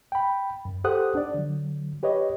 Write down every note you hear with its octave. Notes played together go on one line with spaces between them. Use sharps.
G5 B5
F#2
G4 A4 C5 F#5 D#6 F#6
D4 D5
D3 F#3
G4 B4 C#5 D#5